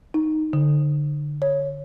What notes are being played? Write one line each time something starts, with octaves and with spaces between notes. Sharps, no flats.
D#4
D3
C#5